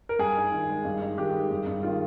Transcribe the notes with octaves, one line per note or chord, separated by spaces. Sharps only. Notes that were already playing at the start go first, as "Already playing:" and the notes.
A#4
G2 G#4
D#4
D#3
G#3
G2
D#4
D#3 G4
G#3
G2
G2
D#3 F4